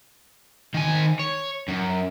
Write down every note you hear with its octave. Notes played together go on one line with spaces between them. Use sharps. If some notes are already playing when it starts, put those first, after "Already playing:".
D#3 G#5
C#5
F#2